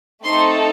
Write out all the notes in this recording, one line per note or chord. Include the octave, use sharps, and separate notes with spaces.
A3 C4 D#4 A4 C6